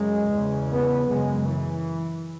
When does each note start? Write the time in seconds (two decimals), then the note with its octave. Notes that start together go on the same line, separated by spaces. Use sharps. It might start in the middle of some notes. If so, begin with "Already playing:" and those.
Already playing: F#2 C#3 G#3
0.34 E2 C#3
0.72 B3
1.10 F#2 C#3 G#3
1.49 E3